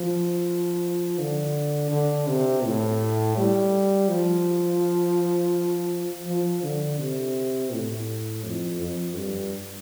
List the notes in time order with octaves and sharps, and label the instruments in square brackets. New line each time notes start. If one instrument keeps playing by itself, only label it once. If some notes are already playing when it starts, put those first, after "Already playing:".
Already playing: [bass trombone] F3
D3
D3
C3
A2
G3
F3
F3
D3
C3
A2
F2
F2
G2